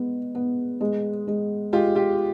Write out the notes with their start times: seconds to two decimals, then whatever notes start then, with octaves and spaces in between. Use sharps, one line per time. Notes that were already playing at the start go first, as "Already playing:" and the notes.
Already playing: G#3 B3
0.35 B3
0.81 G#3
1.27 G#3
1.73 G#3 F4 G4
1.95 F4 G4